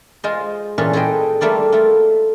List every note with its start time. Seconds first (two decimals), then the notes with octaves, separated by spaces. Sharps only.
0.24 G#3 F4 C5 D#5
0.78 A#2 E3 C#4 F4 G#4 A4
0.93 G#4 A4 B4 C5 D#5 G5
1.41 G3 A3 A#3 F4 D5
1.72 A3 F4